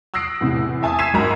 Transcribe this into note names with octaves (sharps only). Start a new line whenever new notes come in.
D#6 E6 F#6 A#6 C7 D7
E2 A2 C3
E5 G#5 A5 D#6
E6 G#6 B6 C7 D#7 E7
G#1 F#2 F#4 A#4 A#5